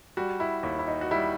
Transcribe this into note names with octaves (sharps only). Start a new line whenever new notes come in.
G3 F#4
E4
D#2 E4
E4
D#4
F#4
G3 E4